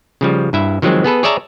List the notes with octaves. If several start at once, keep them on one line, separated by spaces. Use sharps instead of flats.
C#3 F3 G3
G2 E4 E5
D#3 F3 F#3 G#3 C4
B3 G#4 A4 B4
G#4 C#5 D5 E5 A5 A#5